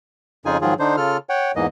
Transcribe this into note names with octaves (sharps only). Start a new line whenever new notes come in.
F2 C#3 D#4 F4 G#4 G#5
G#2 D#3 F3 F#3 F4 G#4
D3 D4 D#4 C5
C#3 F4 A4 F6
C#5 F#5 G5
E2 G#2 E3 A#3 D#5